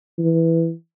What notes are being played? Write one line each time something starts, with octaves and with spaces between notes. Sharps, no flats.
E3